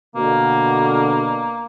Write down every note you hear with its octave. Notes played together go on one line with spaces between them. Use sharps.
B2 D3 A#3